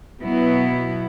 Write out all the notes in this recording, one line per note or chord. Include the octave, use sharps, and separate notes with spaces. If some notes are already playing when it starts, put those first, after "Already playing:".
B2 F#3 B3 E4